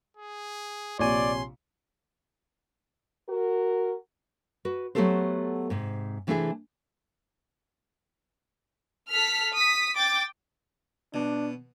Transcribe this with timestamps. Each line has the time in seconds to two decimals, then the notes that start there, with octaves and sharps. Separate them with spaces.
0.17 G#4
0.99 A#1 C3 C#5 D5 G#5 C6
3.28 F#4 A#4
4.65 F#4 B4
4.95 F#3 A3 B3 G4 A4 C5
5.70 G#2 C3
6.27 C3 E3 A3 D4 E4 G#4
9.09 A4 F6 B6
9.56 D#6 B6
9.96 G5 D6 A6
11.14 B2 D4